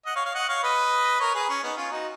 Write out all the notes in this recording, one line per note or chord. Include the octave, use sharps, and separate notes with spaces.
D#5 F#5
C#5 F5
C#5 F5
D#5 F#5
C#5 F5
B4 D#5
A#4 C#5
G#4 B4
C#4
B3 D#4
C#4 F4
D#4 F#4